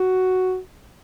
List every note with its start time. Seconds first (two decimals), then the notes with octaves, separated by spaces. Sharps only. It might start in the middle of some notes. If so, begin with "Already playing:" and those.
Already playing: F#4